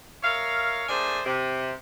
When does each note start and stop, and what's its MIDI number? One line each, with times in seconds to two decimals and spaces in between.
0.23 0.84 70
0.23 0.84 73
0.23 0.84 76
0.23 0.84 77
0.88 1.19 57
0.88 1.19 62
0.88 1.19 68
0.88 1.19 70
0.88 1.19 72
0.88 1.19 80
1.25 1.71 48